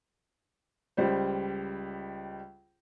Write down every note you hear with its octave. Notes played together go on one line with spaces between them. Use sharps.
C#2 G3 C5